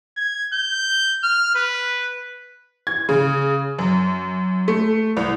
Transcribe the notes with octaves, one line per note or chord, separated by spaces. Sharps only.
G#6
G6
F6
B4
G#6
C#3
F#2
A3
C2